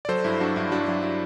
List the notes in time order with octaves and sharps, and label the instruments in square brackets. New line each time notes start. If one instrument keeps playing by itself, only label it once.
[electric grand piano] D5
F#3 A4 C5
G2 E4
F#3 D4 F#4
G2 E4
F#3 D4 F#4
F#3 E4
E4